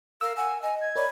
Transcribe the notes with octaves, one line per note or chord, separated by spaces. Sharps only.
A#4 F5 E6
F#5 G#5
D#5 G#5
G#6
A#4 C#5 D5 B5